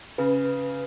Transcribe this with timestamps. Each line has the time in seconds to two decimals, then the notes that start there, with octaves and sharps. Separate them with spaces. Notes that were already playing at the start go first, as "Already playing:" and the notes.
0.18 C#3 B4